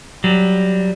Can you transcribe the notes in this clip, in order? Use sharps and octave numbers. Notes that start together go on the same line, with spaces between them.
F#3 G3